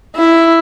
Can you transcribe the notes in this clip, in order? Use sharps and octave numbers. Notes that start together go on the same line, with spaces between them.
E4